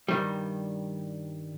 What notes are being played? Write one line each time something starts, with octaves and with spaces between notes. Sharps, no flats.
G2 D#3 G3